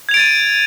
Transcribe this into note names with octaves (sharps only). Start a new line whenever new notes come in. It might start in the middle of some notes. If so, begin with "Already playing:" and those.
G#6 A6 D7 D#7 F7